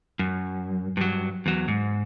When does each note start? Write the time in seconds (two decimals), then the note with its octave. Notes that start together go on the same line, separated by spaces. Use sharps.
0.19 F#2
0.97 G2 F#3
1.46 E2 F#3
1.68 G#2